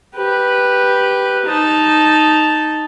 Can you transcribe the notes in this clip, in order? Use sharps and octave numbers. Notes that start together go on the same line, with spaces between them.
G4 B4
D#4 A5